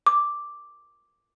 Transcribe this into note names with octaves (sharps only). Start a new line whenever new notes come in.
D6